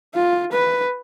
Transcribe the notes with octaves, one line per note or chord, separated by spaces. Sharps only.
F4
B4